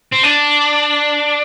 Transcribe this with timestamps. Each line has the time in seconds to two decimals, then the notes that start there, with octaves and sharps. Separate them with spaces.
0.13 C4
0.24 D4